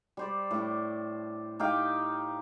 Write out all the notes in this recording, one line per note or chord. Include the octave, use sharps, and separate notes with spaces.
G3 C5 D5
A2 D4
D#4 G4 F5 G5